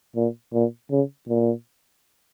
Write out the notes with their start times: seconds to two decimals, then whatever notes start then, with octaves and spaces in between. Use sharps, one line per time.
0.16 A#2
0.53 A#2
0.91 C#3
1.28 A#2